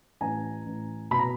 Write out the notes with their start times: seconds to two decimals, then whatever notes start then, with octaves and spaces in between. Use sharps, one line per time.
0.21 A1 G#5 A#5
0.66 A1
1.11 B2 B5
1.19 A#5